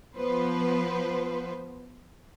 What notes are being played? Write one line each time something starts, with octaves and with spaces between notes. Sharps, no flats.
F3 B3 B4 C5